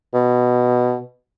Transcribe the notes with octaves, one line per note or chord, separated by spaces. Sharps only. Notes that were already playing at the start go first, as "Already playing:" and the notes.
B2